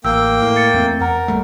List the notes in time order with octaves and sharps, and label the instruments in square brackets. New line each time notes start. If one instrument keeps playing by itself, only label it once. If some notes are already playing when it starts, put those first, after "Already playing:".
[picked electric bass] A1 [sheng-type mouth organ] A#3 G5 [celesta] E6
[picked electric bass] A2
[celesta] A6 C#7
[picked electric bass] E2 A3 C4
[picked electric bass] E2 [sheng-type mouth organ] A#4 [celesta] F#5 A#5
[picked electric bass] G#1 G3 A3